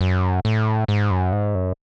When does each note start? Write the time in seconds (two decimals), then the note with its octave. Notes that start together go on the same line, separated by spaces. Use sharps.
0.01 F#2
0.45 A2
0.88 G#2
1.11 F#2
1.32 G#2
1.55 F#2